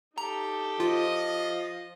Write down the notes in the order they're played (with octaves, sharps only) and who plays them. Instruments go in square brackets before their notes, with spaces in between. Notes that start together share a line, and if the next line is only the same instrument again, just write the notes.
[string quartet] D#4 G4 A4 [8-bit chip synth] A#5
[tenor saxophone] F3 [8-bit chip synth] F4 [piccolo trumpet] D#5